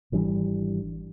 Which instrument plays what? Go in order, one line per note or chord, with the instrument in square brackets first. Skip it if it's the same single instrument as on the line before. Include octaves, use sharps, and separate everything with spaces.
[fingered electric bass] G#1 E3 G3 D4